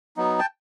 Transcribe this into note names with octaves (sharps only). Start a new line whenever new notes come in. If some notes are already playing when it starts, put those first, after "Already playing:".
F#3 B3 D#4
G5 A5